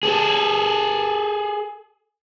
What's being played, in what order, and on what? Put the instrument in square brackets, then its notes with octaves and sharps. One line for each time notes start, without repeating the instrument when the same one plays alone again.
[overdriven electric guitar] G#4 A4